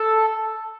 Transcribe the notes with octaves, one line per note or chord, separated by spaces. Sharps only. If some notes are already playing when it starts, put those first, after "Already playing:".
Already playing: A4